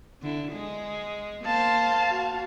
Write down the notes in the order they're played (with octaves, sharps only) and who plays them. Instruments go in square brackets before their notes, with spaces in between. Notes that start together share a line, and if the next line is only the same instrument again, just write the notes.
[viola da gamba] D3 E4
G#3 G#4
[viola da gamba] A#3 C5 [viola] F5 A5
[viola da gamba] F#4